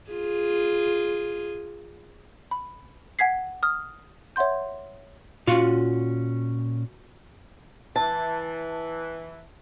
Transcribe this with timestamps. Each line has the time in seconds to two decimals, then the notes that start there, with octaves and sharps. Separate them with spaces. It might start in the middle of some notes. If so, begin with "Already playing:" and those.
0.11 F4 G#4
2.51 B5
3.19 F#5 G#5 G#6 B6 C7
3.63 D#6 F6
4.36 C#5 E5 F#5 C6 G6
5.47 A#2 C#4 F4 F#4 F5
7.96 E3 A5